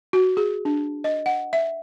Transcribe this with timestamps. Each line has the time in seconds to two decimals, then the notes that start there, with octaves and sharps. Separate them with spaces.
0.13 F#4
0.37 G#4
0.65 D4
1.04 D#5
1.26 F#5
1.53 E5